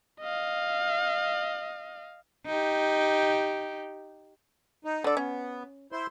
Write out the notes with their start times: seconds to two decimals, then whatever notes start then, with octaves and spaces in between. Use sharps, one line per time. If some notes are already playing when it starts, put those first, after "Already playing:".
0.20 D#5 F5
2.46 D#4 G4
4.85 D#4
5.04 D3 A4 D5
5.17 B3 C#4
5.92 E4 C5 C6